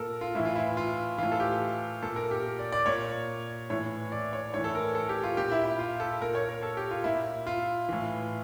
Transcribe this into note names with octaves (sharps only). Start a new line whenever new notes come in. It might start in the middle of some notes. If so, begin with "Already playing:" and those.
Already playing: A#2 A4 A#4
F4
A2 E3 E4
F4
E4
F4
A2 E3 F4
A4
G4
A#2 A4
A#4
G4
D5
D5
A#2 C#5
A2 E3 C#5
D5
C#5
A2 E3 C#5
A4
A#4
A4
G4
F4
A#2 G4
E4
E4
F4
A4
A#2 A#4
C#5
A#4
A4
G4
F4
A#2 E4
F4
A2 E3